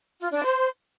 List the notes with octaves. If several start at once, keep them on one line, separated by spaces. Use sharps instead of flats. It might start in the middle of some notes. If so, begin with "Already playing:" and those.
F4
D4
C5